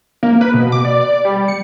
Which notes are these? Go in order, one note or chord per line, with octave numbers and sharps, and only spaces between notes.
A#3
B4
B2
D6
D5
D5
G3
C#7